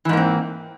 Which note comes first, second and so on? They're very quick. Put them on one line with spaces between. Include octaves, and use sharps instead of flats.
E3 G#2 A#3 C4